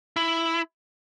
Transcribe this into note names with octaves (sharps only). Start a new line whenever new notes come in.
E4